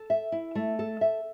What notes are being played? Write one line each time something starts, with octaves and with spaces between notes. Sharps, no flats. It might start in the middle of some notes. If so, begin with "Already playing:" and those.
Already playing: A4
E5
E4
A3
A4
E5